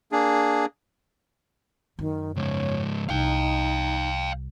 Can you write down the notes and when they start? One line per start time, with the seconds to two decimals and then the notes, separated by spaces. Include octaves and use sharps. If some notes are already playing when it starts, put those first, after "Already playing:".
0.12 A#3 D4 G#4
1.99 F#2 D#3
2.36 C#2 G#2 C#5
3.09 C2 D#4 F5 G5